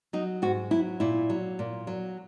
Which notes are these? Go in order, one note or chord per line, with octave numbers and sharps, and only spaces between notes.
F#3 D#4
G#2 F#4
F#3 E4
A#2 E4
F#3
A#2
F#3